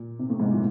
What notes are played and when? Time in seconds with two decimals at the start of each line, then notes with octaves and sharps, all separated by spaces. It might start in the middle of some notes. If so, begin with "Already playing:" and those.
Already playing: A#2
0.19 C3
0.30 A2
0.40 G#2
0.51 A#2